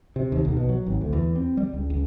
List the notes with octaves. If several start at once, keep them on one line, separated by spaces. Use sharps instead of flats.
C3
D#2
B1
B2
F#3
G#1
D2
E2
C4
G3
C#2
C#2